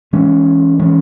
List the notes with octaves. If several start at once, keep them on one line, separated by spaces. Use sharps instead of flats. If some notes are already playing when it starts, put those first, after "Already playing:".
E3 G#3 C#4
E3 G#3 C#4